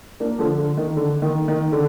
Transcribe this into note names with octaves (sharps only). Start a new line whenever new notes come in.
A#3 D4
D3 F3
D3
D#3
D3
D#3
D#3
D3